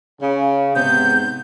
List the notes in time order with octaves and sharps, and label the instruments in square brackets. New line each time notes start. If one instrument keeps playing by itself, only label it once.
[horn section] C#3
[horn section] G#2 C3 B3 [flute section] G6